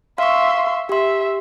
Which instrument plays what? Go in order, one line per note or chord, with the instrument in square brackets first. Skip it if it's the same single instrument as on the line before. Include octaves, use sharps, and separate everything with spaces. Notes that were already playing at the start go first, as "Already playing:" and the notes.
[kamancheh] E5 C6 [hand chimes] F5 C#6
[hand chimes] G4 C6 [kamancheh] E5